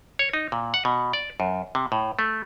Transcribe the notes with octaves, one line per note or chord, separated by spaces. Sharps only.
C#5
D#4
A#2
F#5
B2
D5
F#2
C3
A2
A3